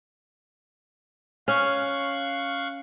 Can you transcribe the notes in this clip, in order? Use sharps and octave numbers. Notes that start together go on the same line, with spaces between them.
C#4 F5 C#6 F#6